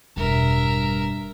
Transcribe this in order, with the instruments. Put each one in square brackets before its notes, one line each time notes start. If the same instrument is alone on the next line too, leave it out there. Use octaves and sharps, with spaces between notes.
[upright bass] E1 [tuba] G2 [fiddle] A#4 E5